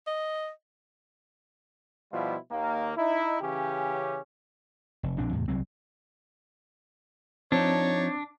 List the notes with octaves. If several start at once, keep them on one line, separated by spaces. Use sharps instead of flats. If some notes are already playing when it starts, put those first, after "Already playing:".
D#5
B2 F3 G3 E4 F4
D#2 D#3 A#3
D#4 E4
C#3 E3 C#4 G4
F1
A#1 F3 C4 D4
E2 A2 C3
C2 F#3 C4
F3 C4 D4 D#4 C#5